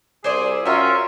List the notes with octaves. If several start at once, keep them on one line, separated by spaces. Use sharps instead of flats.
C2 G#4 C5 D5 E5
F#2 C#4 F4 A#4 E5 G5